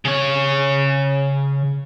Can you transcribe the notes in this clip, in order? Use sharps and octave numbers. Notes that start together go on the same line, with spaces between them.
C#3 C#5